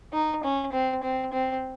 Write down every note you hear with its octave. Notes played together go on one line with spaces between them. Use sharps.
D#4
C#4
C4
C4
C4